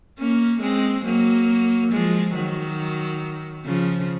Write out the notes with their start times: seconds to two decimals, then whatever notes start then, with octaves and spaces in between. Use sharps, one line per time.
0.18 A#3 C#4
0.61 G#3 C4
1.05 F#3 A#3
1.92 F3 G#3
2.35 D#3 F#3
3.65 C#3 F3